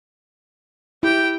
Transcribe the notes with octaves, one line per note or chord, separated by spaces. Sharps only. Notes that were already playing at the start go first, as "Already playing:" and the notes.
E4 G4 G5